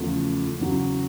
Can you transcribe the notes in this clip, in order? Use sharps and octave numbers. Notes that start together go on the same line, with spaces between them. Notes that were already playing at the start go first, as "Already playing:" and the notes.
Already playing: E2 C#3 F3 A3
E2 C#3 F#3